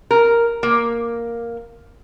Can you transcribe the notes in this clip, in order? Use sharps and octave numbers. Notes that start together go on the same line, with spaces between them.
A#4
A#3